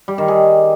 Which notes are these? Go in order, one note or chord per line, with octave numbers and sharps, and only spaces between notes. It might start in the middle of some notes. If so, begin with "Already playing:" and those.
G3
D#3
G#4